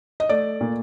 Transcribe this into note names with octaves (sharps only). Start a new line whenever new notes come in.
D#5
A3 D5
A#2